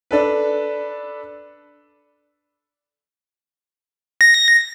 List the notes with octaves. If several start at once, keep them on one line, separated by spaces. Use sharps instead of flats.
D4 A4 B4
A#6